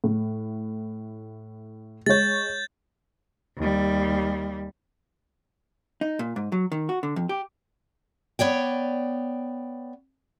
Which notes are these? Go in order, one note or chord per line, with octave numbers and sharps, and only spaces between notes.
A2
G#3 C#5 G6 A6
D#2 G3
D#4
A#2
G#2
F#3
D#3
F#4
D3
F2
G4
B3 C#5 D5 G5